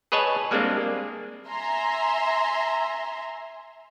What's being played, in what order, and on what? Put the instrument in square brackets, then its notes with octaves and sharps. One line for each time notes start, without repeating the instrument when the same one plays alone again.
[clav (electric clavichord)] G#4 B4 C#5 D#5 G#5 A5
G3 G#3 A#3 C4 D4
[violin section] E5 G#5 A#5 C6